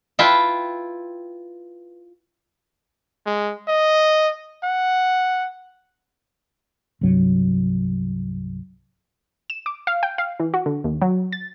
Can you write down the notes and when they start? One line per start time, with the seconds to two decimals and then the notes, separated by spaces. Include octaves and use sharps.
0.19 E4 F4 B4 E5 G5 A5
3.26 G#3
3.68 D#5
4.63 F#5
7.01 C2 G2 F#3
9.50 E7
9.66 D6
9.87 F5
10.03 G5
10.18 F5
10.40 E3
10.54 F#4
10.66 D3
10.84 D#2
11.02 F#3
11.32 A6